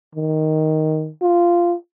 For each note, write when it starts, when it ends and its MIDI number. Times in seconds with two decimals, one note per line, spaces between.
0.15 1.10 51
1.22 1.75 65